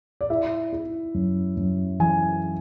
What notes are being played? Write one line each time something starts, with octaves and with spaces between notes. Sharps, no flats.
D5
E4 E5
E4
F#2
F#2
E3 G#5